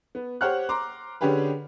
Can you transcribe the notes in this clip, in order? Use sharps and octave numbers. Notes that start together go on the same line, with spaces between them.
B3
G4 C5 C#5 F#5 F6 F#6
A#5 C6 D6
D3 C#4 D4 G4 G#4 B4